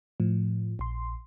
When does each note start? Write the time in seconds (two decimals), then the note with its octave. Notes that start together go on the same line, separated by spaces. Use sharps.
0.20 A2 F3
0.79 A#1 C6